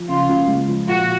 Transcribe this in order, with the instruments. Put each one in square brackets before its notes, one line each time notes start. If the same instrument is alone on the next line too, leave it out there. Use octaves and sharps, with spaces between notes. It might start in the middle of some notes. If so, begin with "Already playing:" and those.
Already playing: [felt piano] F3
[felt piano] C#3 [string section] F4
[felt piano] C#2
G#3
F3
[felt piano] A#2 [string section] F#4